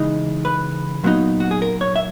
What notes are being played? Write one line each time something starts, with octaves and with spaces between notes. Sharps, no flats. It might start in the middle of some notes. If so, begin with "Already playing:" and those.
Already playing: C#3 E3 G#3 D#4 D#5
B4
A#2 F#3 B3 D#4
F#4
G#4
A#4
C#5
E5